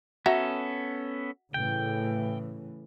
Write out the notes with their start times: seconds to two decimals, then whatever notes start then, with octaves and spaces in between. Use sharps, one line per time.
0.26 B3 C#4 F#4 A4 E5 A#5
1.54 A2 C#3 E3 G5